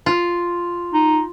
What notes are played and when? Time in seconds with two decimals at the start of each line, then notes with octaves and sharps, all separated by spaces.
0.06 F4
0.94 D#4